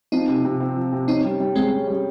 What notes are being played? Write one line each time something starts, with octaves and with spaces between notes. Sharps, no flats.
F3 C4 D#4
C3
C3
C4
F3
C3
C4 C#4 D#4
G3
G3
G#3 C4 G#4
C#4
G3